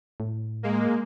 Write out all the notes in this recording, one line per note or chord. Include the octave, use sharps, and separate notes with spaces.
A2
G#3 A#3